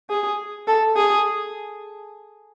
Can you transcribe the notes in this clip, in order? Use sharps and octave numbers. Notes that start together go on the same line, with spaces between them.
G#4
A4
G#4